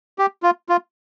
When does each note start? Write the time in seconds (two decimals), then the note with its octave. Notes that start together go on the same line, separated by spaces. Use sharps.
0.19 G4
0.43 F4
0.69 F4